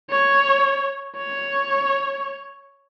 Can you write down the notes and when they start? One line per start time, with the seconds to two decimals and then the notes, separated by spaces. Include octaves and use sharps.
0.10 C#5
1.18 C#5